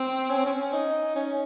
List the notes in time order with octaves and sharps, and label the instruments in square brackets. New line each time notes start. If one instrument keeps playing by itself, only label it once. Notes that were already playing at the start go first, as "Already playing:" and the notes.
Already playing: [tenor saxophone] C4
C#4
C4
C#4
D#4
C#4